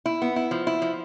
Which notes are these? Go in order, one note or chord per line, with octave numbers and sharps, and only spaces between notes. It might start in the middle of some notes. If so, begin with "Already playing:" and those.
E4
B3
E4
F3
E4
F3